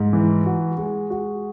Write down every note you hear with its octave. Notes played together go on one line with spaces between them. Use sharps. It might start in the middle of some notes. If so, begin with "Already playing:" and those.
Already playing: G#2
E3
F#4
G#3
F#4